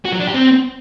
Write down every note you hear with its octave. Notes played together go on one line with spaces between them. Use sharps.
F#4
F#3
D4
G4
C4